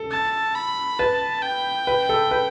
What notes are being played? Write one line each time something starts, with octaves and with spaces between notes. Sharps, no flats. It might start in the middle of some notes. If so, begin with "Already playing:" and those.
Already playing: A4
A5
B5
B4 A5
G5
B4
A4
B4